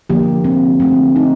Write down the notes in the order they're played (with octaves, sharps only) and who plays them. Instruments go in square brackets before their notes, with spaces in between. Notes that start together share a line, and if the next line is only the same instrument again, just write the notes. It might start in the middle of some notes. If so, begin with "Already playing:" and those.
[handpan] D3 F3 A#3 G4
C4
D3 A3 C4
D#4